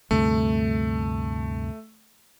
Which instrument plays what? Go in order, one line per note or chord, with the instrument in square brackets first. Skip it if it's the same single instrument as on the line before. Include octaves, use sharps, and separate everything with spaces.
[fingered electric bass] D2 G2 C3 [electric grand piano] A3